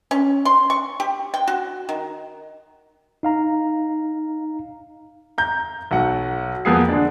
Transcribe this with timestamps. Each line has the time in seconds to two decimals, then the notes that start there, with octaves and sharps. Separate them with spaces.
0.11 C#4
0.45 C6
0.70 C#6
1.00 G4
1.34 G5
1.48 F#4
1.89 D#3
3.23 D#4 F5 A#5
5.38 A#5 G6
5.91 B1 F#3 F#5
6.65 F2 A#3 B3 G#4 C7
6.89 D3 D4